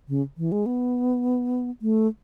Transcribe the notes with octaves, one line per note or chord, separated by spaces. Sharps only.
C#3
E3
G#3
B3
A3